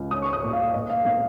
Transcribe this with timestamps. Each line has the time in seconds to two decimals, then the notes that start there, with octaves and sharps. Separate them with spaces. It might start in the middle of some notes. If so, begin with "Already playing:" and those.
Already playing: C#2
0.11 C#4 D#6
0.22 C#6
0.33 D#6
0.43 A#2
0.53 F5
0.74 A#2 D#5
0.90 F5
1.05 A#3 F5